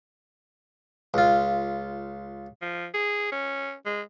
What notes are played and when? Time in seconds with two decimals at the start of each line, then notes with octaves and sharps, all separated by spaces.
1.14 C#2 F4
2.62 F3
2.94 G#4
3.32 C#4
3.86 G#3